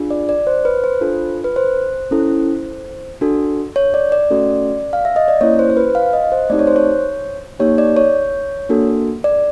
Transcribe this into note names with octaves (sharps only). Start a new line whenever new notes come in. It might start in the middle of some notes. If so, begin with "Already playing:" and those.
Already playing: D4 F4 G#4
D5
D5
C5
B4
C5
D4 F4 A4
B4
C5
C#4 E4 A4
D4 F#4 A4
C#5
D5
D5
A3 C#4 F#4 A4
F5
E5
D#5
D5
A#3 C#4 E4 C#5
C5
C5
B4
F5
D#5
C5
A3 C4 D#4 G4 D5
C#5
C5
C#5
A#3 D#4 G4 C#5
D5
C#5
A#3 D4 F#4 A4
D5